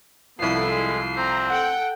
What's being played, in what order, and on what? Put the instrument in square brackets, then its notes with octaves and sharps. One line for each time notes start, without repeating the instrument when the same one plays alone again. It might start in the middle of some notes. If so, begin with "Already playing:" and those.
[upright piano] C2 F3 [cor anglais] B3 [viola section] E4 A4 [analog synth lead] C7
[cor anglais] G#3
[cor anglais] C4 [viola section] A#5
[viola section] A4 G5 [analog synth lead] F#5